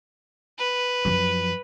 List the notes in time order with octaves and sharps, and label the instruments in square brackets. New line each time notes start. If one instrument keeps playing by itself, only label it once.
[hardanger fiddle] B4
[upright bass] F#2 F3